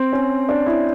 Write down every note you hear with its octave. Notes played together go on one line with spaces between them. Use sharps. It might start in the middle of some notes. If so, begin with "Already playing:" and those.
Already playing: C4
C#4
D4
E4